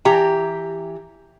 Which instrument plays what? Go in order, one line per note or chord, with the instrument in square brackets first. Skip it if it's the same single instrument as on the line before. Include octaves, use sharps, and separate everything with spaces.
[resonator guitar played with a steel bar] E3 G4 A#5